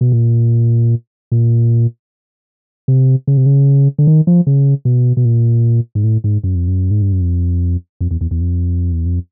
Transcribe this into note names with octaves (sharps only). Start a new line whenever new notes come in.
B2
A#2
A#2
C3
C#3
C3
C#3
D3
D#3
F3
C#3
B2
B2
A#2
G#2
A2
G#2
F#2
F2
F#2
G#2
G2
F#2
F2
F2
E2
E2
E2
F2
E2
F2